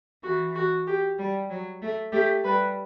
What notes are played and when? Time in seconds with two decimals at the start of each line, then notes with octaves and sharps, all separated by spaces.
0.23 E3 F#4
0.55 F#4
0.87 G4
1.18 G3
1.50 F#3
1.82 A3
2.12 A3 G4
2.44 G3 B4